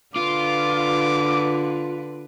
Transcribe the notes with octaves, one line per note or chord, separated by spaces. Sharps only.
D3 F4 B4 D6